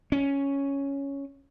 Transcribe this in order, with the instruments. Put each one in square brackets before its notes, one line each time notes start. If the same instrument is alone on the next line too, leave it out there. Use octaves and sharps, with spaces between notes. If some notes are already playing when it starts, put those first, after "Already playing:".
[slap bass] C#4